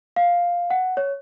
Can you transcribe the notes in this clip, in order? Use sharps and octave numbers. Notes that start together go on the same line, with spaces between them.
F5
F#5
C#5